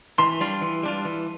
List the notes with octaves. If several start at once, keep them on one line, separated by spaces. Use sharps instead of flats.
E3 C6
G3 D4 F4
E3
G3 D4 F4
E3